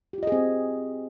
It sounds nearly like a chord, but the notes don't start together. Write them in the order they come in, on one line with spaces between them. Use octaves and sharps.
G4 F4 D#5 G#4 C4